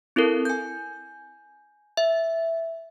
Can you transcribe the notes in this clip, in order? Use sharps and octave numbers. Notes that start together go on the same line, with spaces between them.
C4 E4 A4 A#4
G#5 G6
E5